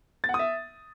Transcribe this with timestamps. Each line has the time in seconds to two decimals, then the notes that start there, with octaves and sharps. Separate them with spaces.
0.24 A6
0.29 F#5
0.34 D#6
0.39 E5